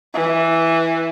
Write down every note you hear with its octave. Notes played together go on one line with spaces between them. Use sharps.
E3